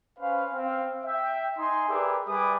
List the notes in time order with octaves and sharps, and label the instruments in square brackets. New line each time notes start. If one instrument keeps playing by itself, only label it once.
[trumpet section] C#4 B4 C5 F5
C4 F5
E5 G5
D#4 G#5 C6
G4 G#4 A#4 B4 D5 E5
G3 B4 E5 G#5 D6 D#6